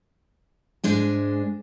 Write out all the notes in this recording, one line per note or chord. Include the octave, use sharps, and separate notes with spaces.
G#2 G#3 D4 G#5